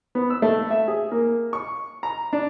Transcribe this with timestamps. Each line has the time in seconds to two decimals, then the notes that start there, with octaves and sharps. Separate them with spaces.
0.15 B3
0.30 E6
0.42 A3
0.71 E5
0.88 G#4
1.12 A#3
1.53 C#6
2.03 A#5
2.33 D4